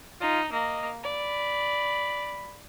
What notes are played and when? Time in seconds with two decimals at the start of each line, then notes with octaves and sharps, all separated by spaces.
0.21 D#4 F4
0.52 A#3 D#5
1.03 D5 B5